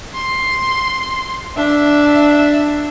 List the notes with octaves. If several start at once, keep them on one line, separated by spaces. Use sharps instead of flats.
C6
D4 E5